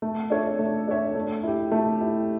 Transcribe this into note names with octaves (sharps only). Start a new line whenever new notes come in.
A3
D4 A4 C#5 E5
A3
D4 A4 C#5 E5
A3
E4 G4
A3
E4 G4